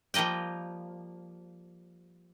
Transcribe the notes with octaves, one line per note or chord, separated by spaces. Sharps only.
F3 G3 A#3 D#5 G5